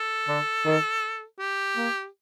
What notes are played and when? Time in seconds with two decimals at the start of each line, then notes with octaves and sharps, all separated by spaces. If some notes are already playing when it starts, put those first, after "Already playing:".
Already playing: A4
0.28 D3
0.66 D#3
1.40 G4
1.77 A#3